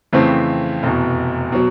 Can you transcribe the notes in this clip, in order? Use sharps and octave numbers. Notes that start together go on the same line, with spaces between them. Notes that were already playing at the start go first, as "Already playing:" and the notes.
F2 C#3 E3 A3 C4
F1 E2 B2
B2 F#3